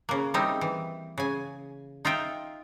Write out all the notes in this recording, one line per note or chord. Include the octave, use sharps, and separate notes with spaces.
C#3 A#3
G3 C4 D#4 E4
E3
C#3 G#5
D#4 F4 E5 G5